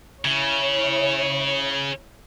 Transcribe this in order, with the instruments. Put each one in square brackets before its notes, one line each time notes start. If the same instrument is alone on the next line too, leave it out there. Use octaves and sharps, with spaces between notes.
[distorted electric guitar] C#3 [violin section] E4 C#5